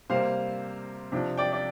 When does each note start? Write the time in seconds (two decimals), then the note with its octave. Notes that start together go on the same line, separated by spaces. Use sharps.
0.10 C3 G3 A#3 C5 F5
1.12 C3 F3 D4
1.37 D5 G5
1.53 D5